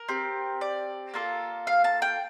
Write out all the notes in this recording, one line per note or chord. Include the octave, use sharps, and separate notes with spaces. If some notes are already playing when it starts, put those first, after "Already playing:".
Already playing: A#4
C4 G4
D5
A#3 F4 A4
F5
A5
G5